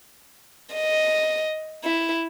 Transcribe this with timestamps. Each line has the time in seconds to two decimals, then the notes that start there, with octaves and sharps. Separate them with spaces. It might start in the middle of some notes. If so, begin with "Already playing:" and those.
0.75 D#5
1.84 E4